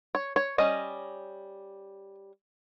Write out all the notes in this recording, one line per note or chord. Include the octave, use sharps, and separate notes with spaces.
C#5
C#5
G3 C#4 D#5